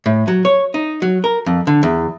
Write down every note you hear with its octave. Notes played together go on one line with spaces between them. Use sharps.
A2
F#3
C#5
D#4
F#3
A#4
F2
D3
E2